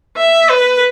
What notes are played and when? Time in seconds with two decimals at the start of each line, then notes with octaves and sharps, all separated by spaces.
0.17 E5
0.50 B4